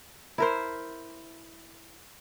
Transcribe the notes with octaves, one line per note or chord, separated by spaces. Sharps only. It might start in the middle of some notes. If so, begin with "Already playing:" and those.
E4 A#4 C5